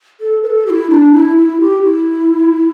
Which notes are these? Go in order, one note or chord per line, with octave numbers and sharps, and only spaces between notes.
A4
B4
A4
G4
E4
D4
E4
E4
G4
E4